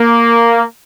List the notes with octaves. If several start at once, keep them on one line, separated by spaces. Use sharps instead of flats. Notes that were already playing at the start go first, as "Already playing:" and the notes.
Already playing: A#3